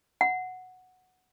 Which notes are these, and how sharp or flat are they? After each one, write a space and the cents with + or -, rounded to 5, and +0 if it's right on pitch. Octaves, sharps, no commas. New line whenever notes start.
F#5 -5